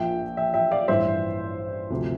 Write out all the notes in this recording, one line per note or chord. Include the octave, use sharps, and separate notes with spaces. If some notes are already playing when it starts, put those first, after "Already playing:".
Already playing: A#1 A#2 F3 E5 G5
E5 G5
E5 G5
D5 F5
A1 G2 E3 C5 E5
D2 C3 F3